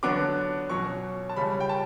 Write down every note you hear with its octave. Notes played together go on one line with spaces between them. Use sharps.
D3 F#3 B3 D4 D6
B2 F#3 C#4 C#6
A5
C#3 G3 C#4 B5
G5
A5